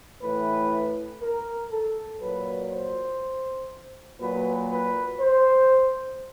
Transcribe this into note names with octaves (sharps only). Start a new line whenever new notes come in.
A2 E3 B4
A#4
A4
A#2 F#3 B4
C5
A#2 F#3 B4
B4
C5